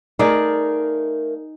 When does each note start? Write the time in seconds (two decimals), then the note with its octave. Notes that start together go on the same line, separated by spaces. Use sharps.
0.19 A3 D#4 G#4 A#4 D5 F5